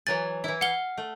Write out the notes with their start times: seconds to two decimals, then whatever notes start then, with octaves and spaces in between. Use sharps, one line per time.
0.07 E3 F#3 G#5 A6
0.44 E3 E4
0.61 F5 F#5 G7
0.98 A3